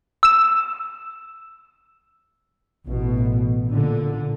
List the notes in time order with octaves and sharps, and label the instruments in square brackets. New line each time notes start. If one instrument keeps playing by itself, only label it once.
[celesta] E6 E7
[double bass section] A1 B2
A#2 D3